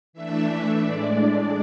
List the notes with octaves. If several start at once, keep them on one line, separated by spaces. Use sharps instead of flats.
E3 A3 D4 E5
A2 G#3 D4 D5